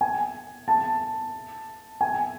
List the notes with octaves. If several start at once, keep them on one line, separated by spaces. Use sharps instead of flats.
G#5
A5
G#5